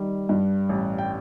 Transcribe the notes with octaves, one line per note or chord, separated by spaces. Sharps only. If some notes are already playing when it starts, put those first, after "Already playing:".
Already playing: D#3 G3
G2
A1
G5